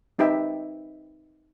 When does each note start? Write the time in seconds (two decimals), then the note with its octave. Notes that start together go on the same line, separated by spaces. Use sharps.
0.19 C4 D#4 G4 B4 E5 G5